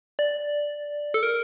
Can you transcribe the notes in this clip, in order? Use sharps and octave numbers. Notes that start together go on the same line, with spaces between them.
D5
A4
A#4